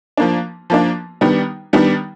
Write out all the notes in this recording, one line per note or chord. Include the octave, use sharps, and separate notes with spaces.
F3 A#3 D4
F3 A#3 D4
D#3 G3 B3 D4
D#3 G3 B3 D4